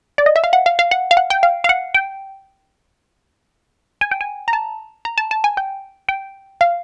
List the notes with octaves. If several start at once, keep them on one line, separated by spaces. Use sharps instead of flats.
D5
D#5
E5
F5
F#5
F5
F5
F#5
F5
F#5
G5
F5
F5
F#5
G5
G#5
G5
G#5
A#5
A5
A#5
A5
A5
G#5
G5
G5
F5